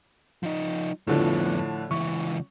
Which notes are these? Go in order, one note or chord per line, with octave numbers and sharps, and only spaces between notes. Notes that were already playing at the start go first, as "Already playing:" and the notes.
F3 D#4
F2 A2 D3 F3 B3
C#2 E3 C#6